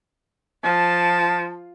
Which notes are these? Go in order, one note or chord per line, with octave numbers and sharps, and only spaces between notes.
F3 A5